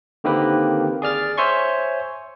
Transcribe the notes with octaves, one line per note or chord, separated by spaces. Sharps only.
D3 D#3 A#3 C4 G4 B4
G#4 D5 F6 A6
C5 C#5 E5 G#5 C6 C#6